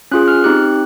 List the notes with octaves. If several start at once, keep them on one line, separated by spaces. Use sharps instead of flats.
C#4 F4 G#4 F#6
F6
C4 D#4 G4 F#6